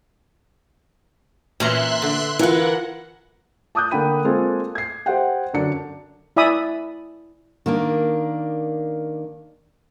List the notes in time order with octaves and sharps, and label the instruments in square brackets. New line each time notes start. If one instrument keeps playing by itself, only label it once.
[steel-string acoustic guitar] A#2 [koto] E3 C#4 A#5 [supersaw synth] E5 C6 F#6
[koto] D3
[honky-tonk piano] E3 F4 [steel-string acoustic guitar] A#4 B4 [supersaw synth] F#5
[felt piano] A5 D6 D#6 F#6 G6
D3 A#3 G5 B5 D#7
G#3 A#3 C4 F4 G#4 A4
G#6 C7
G4 C5 E5 F#5 G5
F#2 D3 D4 C#7
[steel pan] E4 D5 E5 G#5 B5 D#6
[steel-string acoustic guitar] D#3 A#3 D4